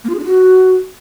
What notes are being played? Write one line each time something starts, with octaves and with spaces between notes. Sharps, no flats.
A#3
F4
G#4
D4
F#4